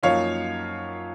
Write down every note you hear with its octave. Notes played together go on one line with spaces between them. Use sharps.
F#2 F3 A#3 D#4 C#5 F5